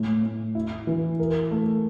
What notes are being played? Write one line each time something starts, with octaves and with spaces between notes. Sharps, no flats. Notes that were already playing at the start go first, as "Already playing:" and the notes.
Already playing: A2
A2
E4
E3
A#4
A3